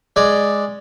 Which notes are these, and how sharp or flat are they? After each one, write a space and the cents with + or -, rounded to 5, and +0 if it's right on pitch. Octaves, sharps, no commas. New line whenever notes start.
G#3 +0 D5 +0